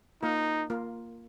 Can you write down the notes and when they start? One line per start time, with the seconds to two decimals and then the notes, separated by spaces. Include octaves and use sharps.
0.23 A#3 D#4 F4 A#4
0.70 A#3 F4 A#4